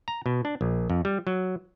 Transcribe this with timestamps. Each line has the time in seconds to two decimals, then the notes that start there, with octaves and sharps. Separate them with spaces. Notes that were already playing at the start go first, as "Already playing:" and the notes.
0.08 A#5
0.26 B2
0.45 D4
0.61 A#1
0.90 F2
1.05 G3
1.27 F#3